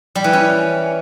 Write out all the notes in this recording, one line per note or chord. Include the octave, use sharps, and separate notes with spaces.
G3
E3
C#4